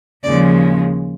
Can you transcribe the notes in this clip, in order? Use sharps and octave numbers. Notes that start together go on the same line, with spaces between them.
D#2 C#3 F3 G#3 D5